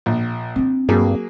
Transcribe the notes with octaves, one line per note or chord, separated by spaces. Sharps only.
A#1
C4 D4
G2 F#3 A#3 G#4